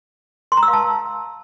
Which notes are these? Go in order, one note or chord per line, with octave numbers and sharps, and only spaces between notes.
C6
A#5
E6
F5
A5